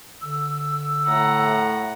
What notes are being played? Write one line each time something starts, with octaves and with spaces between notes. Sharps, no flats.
D3 E6
A2 F#5 A#5